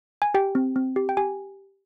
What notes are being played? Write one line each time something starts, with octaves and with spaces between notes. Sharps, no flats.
G#5
G4 G5
C4
C4
G4
G5
G4 G#5